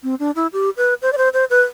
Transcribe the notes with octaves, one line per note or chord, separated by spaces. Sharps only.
C4
D4
E4
G4
B4
C5
D5
C5
C5
B4